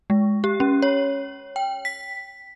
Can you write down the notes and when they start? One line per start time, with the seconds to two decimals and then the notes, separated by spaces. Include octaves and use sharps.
0.10 G#3
0.44 G4
0.60 C#4
0.82 C#5
1.56 G5
1.85 B6